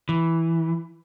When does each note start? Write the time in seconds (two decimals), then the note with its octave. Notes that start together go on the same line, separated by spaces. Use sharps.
0.09 E3